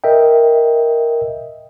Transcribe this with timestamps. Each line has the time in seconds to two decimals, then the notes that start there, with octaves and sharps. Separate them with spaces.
0.04 A#4 D#5 E5 G5